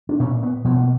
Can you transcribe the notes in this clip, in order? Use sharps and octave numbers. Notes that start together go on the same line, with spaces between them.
D4
A#2 C#4
B3
B2 F3
A#3